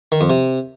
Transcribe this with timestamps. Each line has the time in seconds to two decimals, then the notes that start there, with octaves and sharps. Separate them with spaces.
0.12 D#3
0.21 F2
0.30 C3